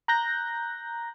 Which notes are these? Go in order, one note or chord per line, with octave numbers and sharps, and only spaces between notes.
A#5 F#6 G6 A#6